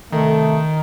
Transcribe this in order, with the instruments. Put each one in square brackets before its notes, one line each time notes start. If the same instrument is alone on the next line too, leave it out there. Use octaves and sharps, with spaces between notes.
[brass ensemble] C3 A3 [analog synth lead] D#3